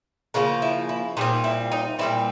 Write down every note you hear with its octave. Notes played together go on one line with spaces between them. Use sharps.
C#3 F3 A#3 A#4
E4
E4
A#2 G3 C4 D#4
E4
D#4
A#2 G3 C4 E4